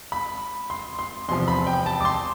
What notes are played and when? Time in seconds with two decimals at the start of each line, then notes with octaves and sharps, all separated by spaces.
0.12 B5
0.70 C6
0.99 C6
1.28 E2 C3 F3 C6
1.48 B5
1.67 G5
1.86 A5
2.00 D6
2.05 C6